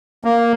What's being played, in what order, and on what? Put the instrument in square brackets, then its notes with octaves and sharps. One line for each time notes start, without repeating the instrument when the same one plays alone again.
[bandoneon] A#3